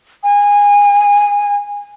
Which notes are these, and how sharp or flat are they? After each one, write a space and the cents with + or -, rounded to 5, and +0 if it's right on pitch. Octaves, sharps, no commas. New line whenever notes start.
G#5 -20